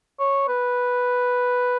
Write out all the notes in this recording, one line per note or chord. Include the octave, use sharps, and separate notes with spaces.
C#5
B4